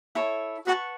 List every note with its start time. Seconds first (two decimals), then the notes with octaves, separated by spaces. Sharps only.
0.15 E4 A4 C#5
0.67 F#4 B4 F#5 A5 C#6